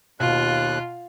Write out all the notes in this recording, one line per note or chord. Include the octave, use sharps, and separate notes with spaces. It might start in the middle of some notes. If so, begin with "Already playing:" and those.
D#2 B2 F4 F#6